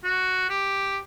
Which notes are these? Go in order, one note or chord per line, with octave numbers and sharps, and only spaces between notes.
F#4
G4